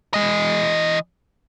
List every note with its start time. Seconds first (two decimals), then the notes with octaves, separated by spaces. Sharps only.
0.14 E3 D#5